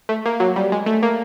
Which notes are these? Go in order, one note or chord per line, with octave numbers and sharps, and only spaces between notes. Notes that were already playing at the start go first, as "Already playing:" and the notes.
A3
A#3
F#3
G3
G#3
A3
A#3